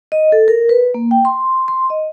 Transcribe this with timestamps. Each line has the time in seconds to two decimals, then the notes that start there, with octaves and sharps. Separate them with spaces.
0.12 D#5
0.32 A4
0.48 A#4
0.69 B4
0.94 A#3
1.11 G5
1.25 C6
1.68 C6
1.90 D#5